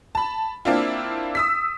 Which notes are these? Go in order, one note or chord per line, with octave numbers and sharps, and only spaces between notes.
A5 B5
A#3 C4 D4 E4 F4
D#6 E6 B6